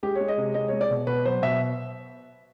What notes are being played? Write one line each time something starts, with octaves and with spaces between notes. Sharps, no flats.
G#3 G4
C#5
G#3
D#5
C3
G#3 D#5
G#3 C#5
D5
B2
B2 B4
F#3 C5
B2 E5